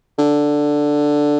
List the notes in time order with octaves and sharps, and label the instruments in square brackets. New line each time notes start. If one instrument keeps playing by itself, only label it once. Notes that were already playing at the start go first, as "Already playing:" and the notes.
[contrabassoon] D3